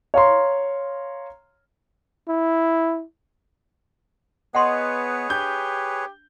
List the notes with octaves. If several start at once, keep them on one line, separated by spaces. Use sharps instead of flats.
C#5 F5 A#5 C6
E4
B3 G#4 B4 C#5 D#5 F#5 C6
D4 G4 G6